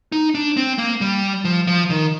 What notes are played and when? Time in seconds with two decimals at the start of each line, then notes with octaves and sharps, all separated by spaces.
0.12 D#4
0.35 D4
0.57 C4
0.78 A#3
1.01 G3
1.45 F3
1.67 F3
1.90 D#3